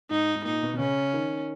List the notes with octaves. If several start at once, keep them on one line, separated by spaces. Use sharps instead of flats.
G#2 D#4
G#2
A#2 D#4
B2
B2
C#3 C#4
D#3